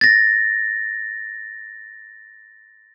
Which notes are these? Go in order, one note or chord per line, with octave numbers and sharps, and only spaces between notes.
A6 A#6